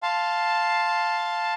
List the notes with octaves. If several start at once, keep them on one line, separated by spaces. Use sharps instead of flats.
F5 A5 C6